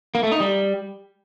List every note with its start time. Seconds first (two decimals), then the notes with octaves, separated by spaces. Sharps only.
0.15 A#3
0.23 A3
0.32 D#4
0.40 G3